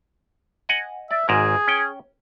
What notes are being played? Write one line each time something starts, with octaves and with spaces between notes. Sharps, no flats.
D#5 F#5 G#5
D5 E5
G#1 G#2 G#4 A#4
C#4 G5